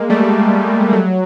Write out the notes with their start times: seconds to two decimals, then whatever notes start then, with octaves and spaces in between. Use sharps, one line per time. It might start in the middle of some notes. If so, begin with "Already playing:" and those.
Already playing: G#3 A#3
0.09 G3 A3
0.93 F#3